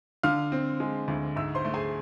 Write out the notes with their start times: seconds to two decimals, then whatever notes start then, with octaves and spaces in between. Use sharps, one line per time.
0.23 D3 F5 F6
0.52 C4
0.80 G#3
1.08 D2
1.36 G#2 E5 E6
1.55 C5 C6
1.65 A3
1.74 G#4 G#5